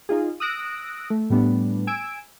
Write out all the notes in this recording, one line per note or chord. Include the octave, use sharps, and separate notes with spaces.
D#4 F4 G#4
D#6 E6 F#6 A#6 D7
A3
A2 G3 B3 D4
G#5 E6 G#6 D7